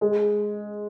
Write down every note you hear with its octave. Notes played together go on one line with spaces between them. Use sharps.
G#3